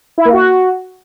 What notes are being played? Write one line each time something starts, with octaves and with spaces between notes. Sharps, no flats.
E4
A#3
F#4